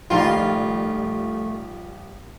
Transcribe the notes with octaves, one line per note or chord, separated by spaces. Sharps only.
A#1 D#2 G3 A3 D#4 F4 D#5